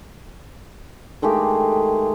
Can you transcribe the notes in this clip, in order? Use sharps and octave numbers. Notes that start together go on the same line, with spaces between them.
D#3 G#3 A3 G4